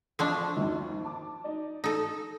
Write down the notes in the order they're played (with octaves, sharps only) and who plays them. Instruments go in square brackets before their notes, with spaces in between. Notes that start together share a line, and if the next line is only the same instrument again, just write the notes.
[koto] F3 C4 D4 [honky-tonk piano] D5 A5 C#6
[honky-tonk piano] G#1 D#2
A5 D6
D#4 D5
[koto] D#4 A4 [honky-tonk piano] D#6